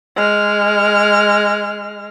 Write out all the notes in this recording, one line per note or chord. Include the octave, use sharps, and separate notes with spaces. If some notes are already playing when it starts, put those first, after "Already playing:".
G#3 F6